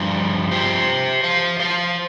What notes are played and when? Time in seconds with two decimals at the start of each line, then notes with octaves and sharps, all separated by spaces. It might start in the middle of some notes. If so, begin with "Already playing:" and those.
Already playing: G2 F3
0.51 G4 C5
1.24 C5 F5
1.60 C5 F5